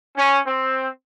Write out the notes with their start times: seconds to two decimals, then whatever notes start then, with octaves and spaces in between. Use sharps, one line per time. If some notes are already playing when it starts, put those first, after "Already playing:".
0.17 C#4
0.47 C4